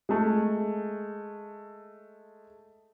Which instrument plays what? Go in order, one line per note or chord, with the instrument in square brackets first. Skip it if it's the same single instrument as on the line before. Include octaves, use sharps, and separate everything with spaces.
[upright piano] G#3 A3